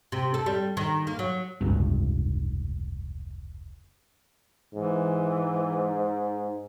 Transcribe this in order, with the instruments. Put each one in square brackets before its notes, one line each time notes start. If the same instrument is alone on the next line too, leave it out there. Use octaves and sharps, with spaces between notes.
[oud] C3
A4
G3
D#3
A#3
F#3
[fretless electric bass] F1 C#2 G2
[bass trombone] G#2 [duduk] E3